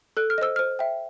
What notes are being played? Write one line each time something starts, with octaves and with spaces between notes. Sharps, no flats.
A4 F#6
F6
C5 D#5 E6
C5 F6
E5 G5